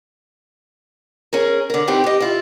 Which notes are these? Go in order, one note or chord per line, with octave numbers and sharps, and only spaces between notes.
C#4 G#4 A#4
D3 A#4
C4 D#4 E4 G4 B4 C5
G4 D#5
E4 F4